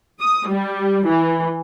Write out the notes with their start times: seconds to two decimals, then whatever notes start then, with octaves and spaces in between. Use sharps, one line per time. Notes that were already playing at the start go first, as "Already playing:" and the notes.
0.20 D#6
0.48 G3
1.06 E3